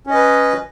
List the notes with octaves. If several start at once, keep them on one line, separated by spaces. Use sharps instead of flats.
C#4 B4 D#5